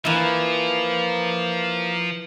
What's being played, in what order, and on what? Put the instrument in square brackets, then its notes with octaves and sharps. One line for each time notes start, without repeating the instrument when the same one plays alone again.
[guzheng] E3 E4 [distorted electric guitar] F3 [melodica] A#3